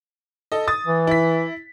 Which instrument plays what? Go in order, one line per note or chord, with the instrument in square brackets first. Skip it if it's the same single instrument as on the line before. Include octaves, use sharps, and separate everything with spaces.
[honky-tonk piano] A4 D#5
D#6 A6
[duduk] E3
[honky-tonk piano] E4 B6